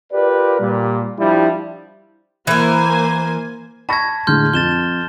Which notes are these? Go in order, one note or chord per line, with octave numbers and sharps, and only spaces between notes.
F4 G4 A#4 B4 D5
A#2 G3
F3 G3 D4 E4
E3 A#3 A#4 C5 G#5
A5 B5 C#6 G#6 A#6
A2 D3 G#3 C6 F6 G6
F2 A6 E7 G7